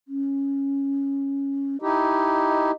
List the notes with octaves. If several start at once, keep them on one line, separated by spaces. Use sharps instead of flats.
C#4
D#4 E4 G4 D#5